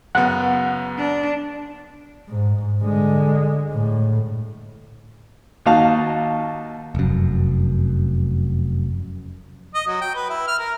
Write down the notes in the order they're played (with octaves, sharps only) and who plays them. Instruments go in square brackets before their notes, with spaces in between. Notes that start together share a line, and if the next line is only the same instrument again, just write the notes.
[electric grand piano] F#2 C#3 B3 [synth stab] F#5
[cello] D4
[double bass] G#2
D3 G#3
A2
[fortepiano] D#2 D#4 F#4 F5 A5
[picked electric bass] F1 F#2
[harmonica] D#5
F#3
G5
B4
E4
F6
A#4